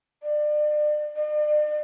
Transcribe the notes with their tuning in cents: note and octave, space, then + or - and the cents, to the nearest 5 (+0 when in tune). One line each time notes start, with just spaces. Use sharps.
D5 +35
D5 +45